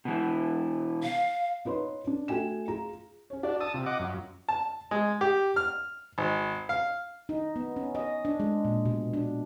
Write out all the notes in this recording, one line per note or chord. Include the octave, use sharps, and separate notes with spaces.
B2 E3
F5
D#4 F4 B4 C#5 C6
D4
A3 F#4 G5 G#5 E7
F4 G#4 A#5
C#4 C#5
D4 F#4 D5
A5 D#6 E6
C3 F4
D#5 F#5 D6
F#2
A5
G#3
G4
F6
G#1
F5
D#4
B3
C#4
D#5
D4
G#3
A#2
B2
D4